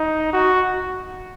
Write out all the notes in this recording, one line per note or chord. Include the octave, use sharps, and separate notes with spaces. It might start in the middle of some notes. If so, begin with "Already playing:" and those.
Already playing: D#4
F#4